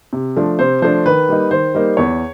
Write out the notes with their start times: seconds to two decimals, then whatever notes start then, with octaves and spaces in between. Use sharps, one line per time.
0.13 C3
0.36 F3 A3 D4
0.59 C3 C5
0.82 F3 A3 D4 C5
1.06 D#3 B4
1.29 G3 A#3 D#4
1.51 D#3 C5
1.74 G3 A#3 D#4
1.97 E2 C#5